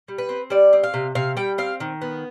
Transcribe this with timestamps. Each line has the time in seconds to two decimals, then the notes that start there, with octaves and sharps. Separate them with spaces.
0.08 G3
0.18 B4
0.29 C4
0.50 G3 D5
0.73 C4
0.83 F5
0.94 C3
1.15 C3 F5
1.37 G3 G5
1.58 C4 F5
1.80 D#3
2.02 B3